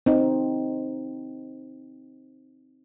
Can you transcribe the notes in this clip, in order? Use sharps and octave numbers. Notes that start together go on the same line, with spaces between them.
C4 D#4